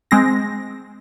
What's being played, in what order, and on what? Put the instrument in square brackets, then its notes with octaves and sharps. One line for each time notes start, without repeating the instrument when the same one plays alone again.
[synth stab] G#3 C4 A#6